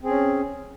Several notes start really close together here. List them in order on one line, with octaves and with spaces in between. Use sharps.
C4 G#4 C#4